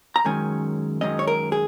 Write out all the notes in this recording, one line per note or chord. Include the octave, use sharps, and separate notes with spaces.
A#5
F#2 D#3 G#3 C#4 G#5
F#2 D#3 G#3 C#4 D#5
C#5
A#4
G#4